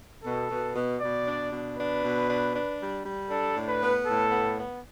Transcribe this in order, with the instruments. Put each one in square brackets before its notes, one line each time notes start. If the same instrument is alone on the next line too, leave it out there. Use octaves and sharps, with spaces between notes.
[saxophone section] B2 [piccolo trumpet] A4
[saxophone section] B2
B2
[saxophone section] B2 [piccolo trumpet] D5
[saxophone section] D4
B2
[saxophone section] D4 [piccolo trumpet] B4
[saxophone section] B2
D4
D4
G3
G3
[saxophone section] D4 [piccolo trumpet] A4
[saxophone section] A2
[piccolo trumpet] B4
[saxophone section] B3
[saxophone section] A2 [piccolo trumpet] A4
[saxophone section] B3
B3